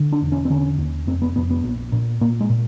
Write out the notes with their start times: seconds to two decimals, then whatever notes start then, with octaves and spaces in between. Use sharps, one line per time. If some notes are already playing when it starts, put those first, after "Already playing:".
Already playing: D3
0.12 D4
0.22 E1
0.32 C#4
0.45 C4
0.50 D3 C#4
0.78 D#2
1.07 F1 C4
1.22 B3
1.36 F1 B3
1.50 B3
1.64 A#1
1.92 A#2
2.21 A#2 A#3
2.41 G#3
2.50 A#2